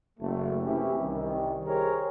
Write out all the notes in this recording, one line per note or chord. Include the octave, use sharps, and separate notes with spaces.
F#1 A3
C3 E3 C#4 E4 G4
C2 D#3
G4 G#4 A#4 C5 C#5